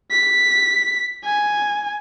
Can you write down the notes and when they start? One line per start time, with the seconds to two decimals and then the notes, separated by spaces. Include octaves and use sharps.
0.11 B6
1.24 G#5